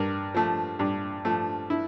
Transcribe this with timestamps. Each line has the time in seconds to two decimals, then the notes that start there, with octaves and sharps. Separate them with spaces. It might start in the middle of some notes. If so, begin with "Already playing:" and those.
Already playing: G2 A#4
0.34 F3 A3
0.79 G2
1.25 F3 A3
1.70 E4